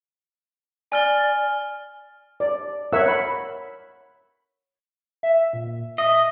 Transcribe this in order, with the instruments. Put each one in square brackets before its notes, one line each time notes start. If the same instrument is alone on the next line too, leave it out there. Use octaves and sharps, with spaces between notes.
[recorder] D5 [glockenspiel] G#5 F6 G7
[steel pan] D5
A#4 C#5 E5 F#5 E6
B5
[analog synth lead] E5
A#2
[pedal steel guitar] D#5 [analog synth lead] E5